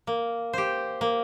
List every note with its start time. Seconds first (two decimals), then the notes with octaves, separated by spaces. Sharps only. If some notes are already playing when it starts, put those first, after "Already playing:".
0.07 A#3
0.53 G4 C5
1.01 A#3